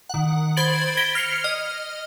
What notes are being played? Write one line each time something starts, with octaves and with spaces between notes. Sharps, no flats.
D#3 F#5
C5 B5 G#6 A6 D7 F#7
G#6 A#6 B6 D7 G7
F6 C7 C#7 F7
D#5 F6